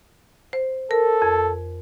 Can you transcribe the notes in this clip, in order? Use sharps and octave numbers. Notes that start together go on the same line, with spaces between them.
C5
A4 A#4
F2